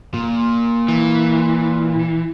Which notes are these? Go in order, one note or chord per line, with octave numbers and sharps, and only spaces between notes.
A#2
E3